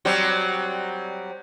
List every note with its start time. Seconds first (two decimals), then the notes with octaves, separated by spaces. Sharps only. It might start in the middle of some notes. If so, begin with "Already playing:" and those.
0.05 F#3 G3 C4